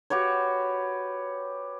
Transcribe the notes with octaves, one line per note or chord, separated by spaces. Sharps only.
F#4 G4 B4 C#5